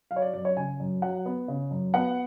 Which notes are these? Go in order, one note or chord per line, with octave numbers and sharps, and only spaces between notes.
F#3 F5
C#5
D5
F#2 D5
C#5
C#3 G#5
F#2
F#3 F#5
B3
C#3
F#2
B3 F#5